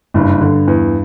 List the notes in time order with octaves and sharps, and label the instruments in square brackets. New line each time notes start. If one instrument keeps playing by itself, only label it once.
[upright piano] F#1 [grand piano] G2
[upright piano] D3
E2